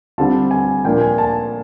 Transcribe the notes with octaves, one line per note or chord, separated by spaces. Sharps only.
D3 G3 C4 F4 A5
G#5
A#2 F3 A#3 D4 F4 G5
G#5
A5